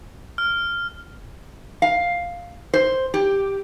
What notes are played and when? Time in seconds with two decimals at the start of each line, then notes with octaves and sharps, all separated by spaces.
0.38 F6
1.82 F5
2.74 C5
3.14 G4